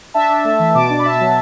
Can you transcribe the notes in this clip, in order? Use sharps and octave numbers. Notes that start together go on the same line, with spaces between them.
D4 E5 A5
D4
A3
E3
B2 A5 D6
D4
B5
B2 E5 A5
F#3